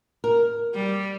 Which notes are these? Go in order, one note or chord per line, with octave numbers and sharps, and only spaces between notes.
A#4
G3